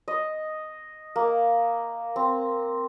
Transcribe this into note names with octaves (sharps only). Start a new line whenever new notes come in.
D#5
A#3
C4